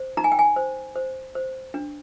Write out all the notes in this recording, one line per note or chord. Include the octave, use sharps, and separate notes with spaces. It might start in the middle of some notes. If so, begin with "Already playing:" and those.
Already playing: C5
D#4 A#5
G#5
G5
G#5
C5
C5
C5
D4